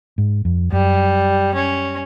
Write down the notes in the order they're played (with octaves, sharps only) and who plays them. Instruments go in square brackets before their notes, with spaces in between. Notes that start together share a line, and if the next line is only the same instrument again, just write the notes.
[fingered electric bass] G#2
F2
[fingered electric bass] F#2 [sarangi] G3
[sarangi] C#4